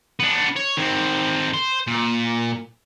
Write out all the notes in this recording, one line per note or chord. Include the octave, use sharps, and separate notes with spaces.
B3 D4
C#5
D#3 C4
C5
A#2